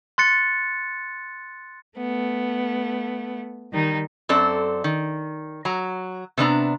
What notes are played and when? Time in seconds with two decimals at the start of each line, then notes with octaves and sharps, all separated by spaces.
0.18 C6 F#6 A6 C#7
1.96 A3 B3
3.72 D#3 G3 D#4
4.29 F#2 C4 A4 D5
4.84 D#3
5.65 F#3 A#5
6.38 C3 B3 D4 A#5